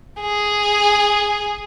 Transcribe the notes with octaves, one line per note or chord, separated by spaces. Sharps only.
G#4